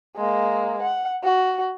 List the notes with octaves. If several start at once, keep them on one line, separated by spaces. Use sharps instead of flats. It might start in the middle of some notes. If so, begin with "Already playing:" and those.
G#3 A#3
F#5
F#4